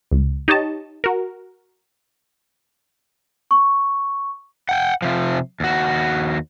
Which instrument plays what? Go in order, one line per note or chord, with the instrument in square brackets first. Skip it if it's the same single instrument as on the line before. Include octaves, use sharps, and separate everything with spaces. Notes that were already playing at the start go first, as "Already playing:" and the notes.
[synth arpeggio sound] C#2
D#4 G4 C#5 D#5 A5
F#4 A#4
[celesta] C#6
[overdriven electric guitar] F#5 G5
C3 F3
D#2 F#4